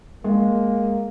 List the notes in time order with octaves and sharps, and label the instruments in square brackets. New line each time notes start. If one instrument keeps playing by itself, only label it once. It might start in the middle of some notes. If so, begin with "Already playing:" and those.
[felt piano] G#3 [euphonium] A#3